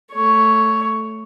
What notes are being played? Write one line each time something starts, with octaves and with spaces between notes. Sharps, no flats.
A3 C#5